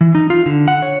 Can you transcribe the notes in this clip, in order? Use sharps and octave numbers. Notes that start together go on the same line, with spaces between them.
E3
D#4
F4
D3
F#5
C#5